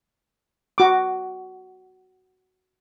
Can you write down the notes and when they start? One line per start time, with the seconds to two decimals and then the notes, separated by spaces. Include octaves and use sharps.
0.78 F#4 D6